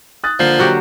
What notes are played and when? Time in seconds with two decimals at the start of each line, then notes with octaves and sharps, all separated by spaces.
0.24 D#6 F#6 A6
0.39 D3 F3 A#3 C7
0.59 F#3 F#4 G4